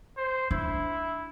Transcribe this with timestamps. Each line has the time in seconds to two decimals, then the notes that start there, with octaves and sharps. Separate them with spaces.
0.17 C5
0.51 D4 E4